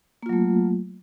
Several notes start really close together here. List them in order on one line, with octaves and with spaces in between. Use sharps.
A#3 F4 F#3 A3